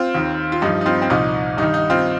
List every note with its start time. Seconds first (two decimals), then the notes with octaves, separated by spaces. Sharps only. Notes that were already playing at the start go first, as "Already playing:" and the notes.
Already playing: C4 F4
0.15 D#2 D#3
0.52 F4
0.62 G2 F3 D#4
0.81 D#4
0.86 C4 F4
1.02 C4
1.10 C2 A#2 F3 D#4
1.57 G2 D#3 D#4
1.74 D#4
1.90 C4 F4